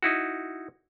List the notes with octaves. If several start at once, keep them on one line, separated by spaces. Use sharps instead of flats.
D#4 E4 F#4